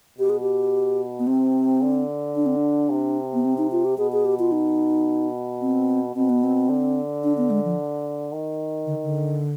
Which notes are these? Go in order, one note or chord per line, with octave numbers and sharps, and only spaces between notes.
B2 G4
G#4
G4
B3
C3 C4
D3
D4
C4
D4
C3
B3
C4
D#4
F4
G4
B2 G#4
G#4
G4
F4
D#4
C4
B2 C4
B3
C4
D3
D4
B3
G#3
F3
D#3
D3
D3